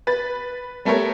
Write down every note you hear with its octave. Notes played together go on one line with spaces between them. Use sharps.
B4 A6
G3 A3 B3 A4 A#4 C#5